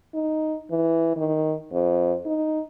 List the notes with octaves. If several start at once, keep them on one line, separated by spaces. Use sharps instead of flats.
D#4
E3
D#3
F2
D#4